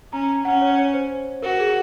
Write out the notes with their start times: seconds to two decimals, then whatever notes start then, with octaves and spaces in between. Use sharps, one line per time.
0.13 C#4 A#5
0.45 C#4 F#5
0.62 C#5
0.78 C#5
0.94 C5
1.42 F#4 A#4
1.60 G#4